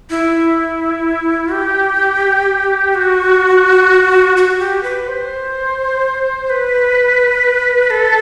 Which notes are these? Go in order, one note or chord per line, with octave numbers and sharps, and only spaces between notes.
E4
G4
F#4
F#4
G4
B4
C5
B4
A4